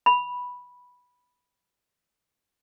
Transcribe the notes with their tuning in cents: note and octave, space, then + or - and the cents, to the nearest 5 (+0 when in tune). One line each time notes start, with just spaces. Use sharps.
B5 -5